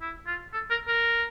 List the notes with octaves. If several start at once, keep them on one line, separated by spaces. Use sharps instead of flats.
E4
F4
A4
A#4
A#4